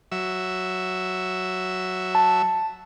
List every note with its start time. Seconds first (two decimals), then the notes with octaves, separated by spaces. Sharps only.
0.12 F#3 E5
2.15 A5